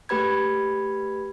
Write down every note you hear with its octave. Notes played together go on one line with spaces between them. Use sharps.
A3 G4 B4 B5 G#6